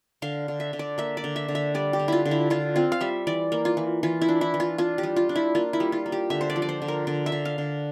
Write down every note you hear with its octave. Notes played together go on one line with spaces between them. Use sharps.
D3 F5
D3
E5
D3
D5
A#3 E5
D5
D3
E5
D3
E5
G3 D5
G4
D3
E4 F4
D3
E4
D3 F4
C4 F4
F5
G3 E5
E3 D5
A#3
F4
E3
E3 F4
E4
D4
E4
E3
F4
D4 F4
G4
G3
F4
D4
E4
A#3 F4
E4
G3
F4
A#3
G4
D3 E5
C5
D5
F3
D5
C5
D3
A#4
D3 D5
E5
D3
F5
D3